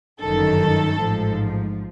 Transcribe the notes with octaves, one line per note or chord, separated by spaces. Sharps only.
G1 F#2 D#3 A4
A1 G#2 F3